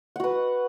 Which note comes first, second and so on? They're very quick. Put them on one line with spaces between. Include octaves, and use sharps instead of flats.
F#5 F#4 B4